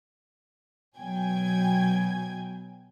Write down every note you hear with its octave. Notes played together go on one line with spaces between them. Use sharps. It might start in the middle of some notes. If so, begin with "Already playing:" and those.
B2 F#3 G5 G#5 G#6